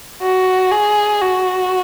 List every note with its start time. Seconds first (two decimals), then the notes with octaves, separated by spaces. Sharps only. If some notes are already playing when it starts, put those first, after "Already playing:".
0.22 F#4
0.71 G#4
1.21 F#4